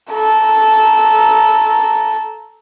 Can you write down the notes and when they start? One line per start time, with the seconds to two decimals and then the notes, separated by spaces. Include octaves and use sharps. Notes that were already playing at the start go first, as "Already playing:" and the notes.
0.11 A4 A#5